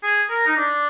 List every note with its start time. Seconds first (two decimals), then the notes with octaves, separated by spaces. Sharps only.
0.03 G#4
0.30 A#4
0.46 D#4
0.57 D4